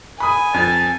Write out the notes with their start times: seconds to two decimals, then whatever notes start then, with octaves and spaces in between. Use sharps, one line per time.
0.20 G#5 B5 D#6
0.54 F2 A5